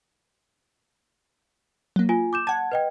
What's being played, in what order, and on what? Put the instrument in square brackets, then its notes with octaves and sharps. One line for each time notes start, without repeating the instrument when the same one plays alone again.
[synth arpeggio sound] F#3 A#3
[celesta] F4 G#5
D6 G6 E7
[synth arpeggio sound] F#5 G#6 [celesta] A5
[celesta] B4 D#5 G5